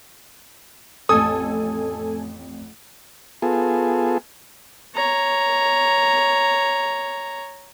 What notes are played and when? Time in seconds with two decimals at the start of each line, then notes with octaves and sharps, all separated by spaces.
1.09 A1 F2 A4 G#5 D#6
3.42 B3 F4 G#4 A4
4.95 C#5 A#5